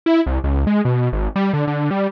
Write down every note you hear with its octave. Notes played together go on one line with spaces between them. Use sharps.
E4
C2
C#2
G#3
B2
G#1
G3
D3
D3
G3